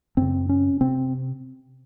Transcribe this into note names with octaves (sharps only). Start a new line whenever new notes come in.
F#2 C#3 C4
C#4
C3 C4